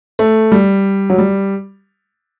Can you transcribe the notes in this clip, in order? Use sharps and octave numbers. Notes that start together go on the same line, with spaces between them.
A3
G3
F#3
G3